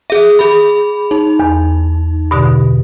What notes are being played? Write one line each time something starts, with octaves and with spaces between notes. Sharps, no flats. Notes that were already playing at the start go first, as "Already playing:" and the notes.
G#4 E5
G#4 B5
D#4
E2
G2 B2 D3